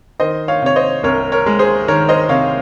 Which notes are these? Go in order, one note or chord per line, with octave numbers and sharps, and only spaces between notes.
D#3 C5 D#5
C#5 F5
C3 C#5
C5 D#5
C2 A#4 C#5
A#4 C#5
G#3
G#4 C5
D#3 A#4 C#5
C5 D#5
C3 C#5 F5